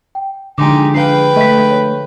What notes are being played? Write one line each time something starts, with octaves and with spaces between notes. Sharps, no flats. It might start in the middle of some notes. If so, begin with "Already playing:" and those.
G5
D3 F3 G#3 D#4 G4 G#5 C6 D6
D4 G#4 B4 F5 G5 C7
A3 D#5 B6
C#5